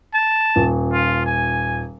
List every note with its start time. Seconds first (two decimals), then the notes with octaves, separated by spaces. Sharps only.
0.14 A5
0.56 D#1
0.93 F4
1.26 G#5